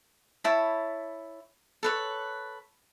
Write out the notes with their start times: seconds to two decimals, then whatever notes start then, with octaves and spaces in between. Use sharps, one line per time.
0.44 E4 C#5 A5 B5
1.83 A4 B4 C#5